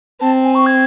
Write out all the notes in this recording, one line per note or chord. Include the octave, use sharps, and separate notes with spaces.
C4 A5
G#5
C#6
G#6